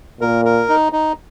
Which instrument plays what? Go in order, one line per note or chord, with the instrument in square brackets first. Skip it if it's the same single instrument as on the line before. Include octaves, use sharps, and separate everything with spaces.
[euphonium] A#2 [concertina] A#4
[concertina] A#4
D#4
D#4